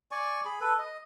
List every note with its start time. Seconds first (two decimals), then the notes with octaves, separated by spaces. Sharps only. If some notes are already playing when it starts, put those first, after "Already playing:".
0.11 D5 G#5 C#6
0.45 G#4 B5
0.61 A4 B4
0.79 D#5